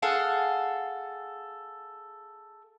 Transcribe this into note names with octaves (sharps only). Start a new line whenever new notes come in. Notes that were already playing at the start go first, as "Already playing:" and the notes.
G#4 A4 F5 F#5